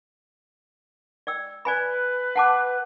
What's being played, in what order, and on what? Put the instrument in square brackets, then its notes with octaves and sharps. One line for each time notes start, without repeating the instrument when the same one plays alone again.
[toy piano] D5 G5 E6
[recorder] B4 [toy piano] D5 G#5 B5
[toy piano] F#5 A5 D6